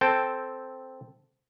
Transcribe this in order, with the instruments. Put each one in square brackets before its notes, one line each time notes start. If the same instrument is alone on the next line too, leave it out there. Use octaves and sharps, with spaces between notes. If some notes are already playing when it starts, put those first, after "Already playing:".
[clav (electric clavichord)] C4 A4 G5